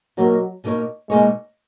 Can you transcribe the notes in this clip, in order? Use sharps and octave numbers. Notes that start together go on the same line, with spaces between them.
B2 F#3 A#3 D#4 A#4 C#5
B2 A#3 D#4 A#4 C#5
B2 G#3 A#3 D#4 A#4 C#5